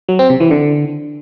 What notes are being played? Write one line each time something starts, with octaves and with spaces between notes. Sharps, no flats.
F#3
C4
C3
E3
D3